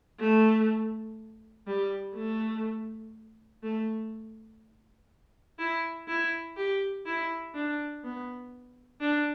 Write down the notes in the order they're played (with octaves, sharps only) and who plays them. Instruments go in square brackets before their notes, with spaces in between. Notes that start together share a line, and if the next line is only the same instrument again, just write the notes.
[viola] A3
G3
A3
A3
E4
E4
G4
E4
D4
B3
D4